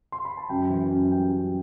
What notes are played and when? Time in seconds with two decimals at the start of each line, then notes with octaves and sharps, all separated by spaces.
0.12 C6
0.25 B5
0.37 A5
0.50 F#2 G5
0.70 E3
0.91 F#2
1.11 G3 G5
1.32 F#2